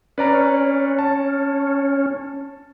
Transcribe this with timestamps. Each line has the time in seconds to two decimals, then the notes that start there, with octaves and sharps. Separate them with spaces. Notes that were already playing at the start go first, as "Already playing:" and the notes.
0.18 C#4 B4 D5 A#5
0.99 A5